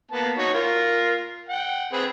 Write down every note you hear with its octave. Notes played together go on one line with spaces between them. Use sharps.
A#3 B3 A5
D#4 F#4 C#5
F4 A#4
F#5 G5
C4 G#4 B4